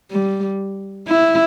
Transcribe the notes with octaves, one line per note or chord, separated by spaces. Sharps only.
G3
E4